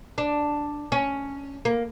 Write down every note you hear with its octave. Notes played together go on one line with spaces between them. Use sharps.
D4
C#4
A#3